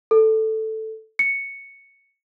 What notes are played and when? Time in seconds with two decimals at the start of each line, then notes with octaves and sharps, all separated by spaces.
0.11 A4
1.19 C#7